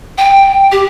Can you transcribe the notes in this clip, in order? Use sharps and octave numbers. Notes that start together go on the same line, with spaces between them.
G5
G4